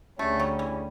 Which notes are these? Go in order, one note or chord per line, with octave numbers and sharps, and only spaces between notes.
D2 C#3 G3 A3 C#4
F#3
E3